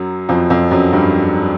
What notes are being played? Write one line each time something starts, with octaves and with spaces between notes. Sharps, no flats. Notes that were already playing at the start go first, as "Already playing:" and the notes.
Already playing: F#2 F#3
F2 F3
F2 F3
F#2 F#3
G2 G3